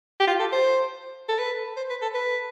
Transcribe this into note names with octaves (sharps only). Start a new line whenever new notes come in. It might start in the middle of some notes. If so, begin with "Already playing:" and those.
G4
F4
A4
C5
A4
B4
C5
B4
A4
B4